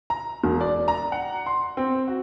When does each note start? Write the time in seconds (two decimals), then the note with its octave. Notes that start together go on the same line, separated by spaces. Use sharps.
0.10 A#5
0.44 E1
0.61 D5
0.88 A#5
1.12 F#5
1.46 C6
1.77 C4
2.08 F#4